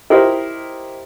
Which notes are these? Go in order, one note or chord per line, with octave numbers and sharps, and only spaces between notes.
E4 G4 A#4 C5 D#5 E5